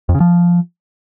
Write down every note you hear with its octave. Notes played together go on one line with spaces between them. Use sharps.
F2
C#3
F3